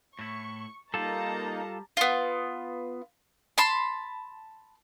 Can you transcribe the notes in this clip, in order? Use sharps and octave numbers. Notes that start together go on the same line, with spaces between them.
A2 E4 C#6
G3 A#3 D#4 F4 A4 A5 A#5
B3 F4
A5 B5 C6